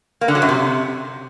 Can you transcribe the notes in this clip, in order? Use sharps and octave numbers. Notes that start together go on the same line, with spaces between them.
A#3
D3
F#3
F#2
C3